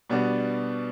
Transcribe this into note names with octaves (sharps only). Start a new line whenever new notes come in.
B2 G3 B3 D4 F#4